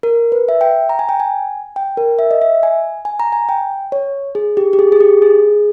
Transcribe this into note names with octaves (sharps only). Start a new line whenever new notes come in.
A#4
B4
E5
G5
A#5
G#5
G5
G#5
G5
A#4
E5
D#5
E5
G#5
G#5
A#5
G#5
G5
C#5
G#4
G4
G4
G#4
G#4
G4
G#4